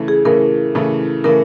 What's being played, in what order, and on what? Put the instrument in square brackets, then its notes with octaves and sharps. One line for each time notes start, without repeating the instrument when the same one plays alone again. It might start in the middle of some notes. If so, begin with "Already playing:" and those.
Already playing: [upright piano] C#3 E3 A3
[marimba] G#4
[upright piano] C#3 E3 A3 [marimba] A#4
[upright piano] C#3 E3 A3
[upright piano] C#3 E3 A3 [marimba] A#4